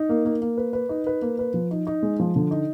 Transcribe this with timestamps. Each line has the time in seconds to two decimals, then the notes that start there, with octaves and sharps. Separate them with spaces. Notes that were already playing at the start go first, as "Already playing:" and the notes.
Already playing: D#4
0.09 A#3
0.25 A#3
0.41 A#3
0.57 B4
0.73 B4
0.89 D#4
1.07 B4
1.22 A#3
1.39 B4
1.54 F3
1.71 D#4
1.87 D#4
2.03 G#3
2.20 F3
2.36 D3
2.51 D#4